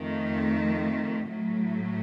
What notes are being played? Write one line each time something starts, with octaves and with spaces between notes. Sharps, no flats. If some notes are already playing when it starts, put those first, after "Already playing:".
Already playing: F2 D#3 A3
A2 F#3 A3